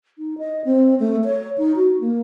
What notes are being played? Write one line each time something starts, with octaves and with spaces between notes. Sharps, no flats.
D#4
D#5
C4
A3
C#5
D#4
F#4
A#3